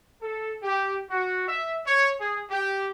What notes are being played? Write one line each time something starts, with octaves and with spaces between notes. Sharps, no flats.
A4
G4
F#4
E5
C#5
G#4
G4